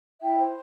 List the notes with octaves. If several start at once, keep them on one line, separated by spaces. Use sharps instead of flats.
E4 E5 G5
C5